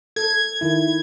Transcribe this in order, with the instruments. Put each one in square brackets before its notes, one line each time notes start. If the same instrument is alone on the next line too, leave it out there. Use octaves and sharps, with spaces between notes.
[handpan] A4 [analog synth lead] G#6
[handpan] D#3 E4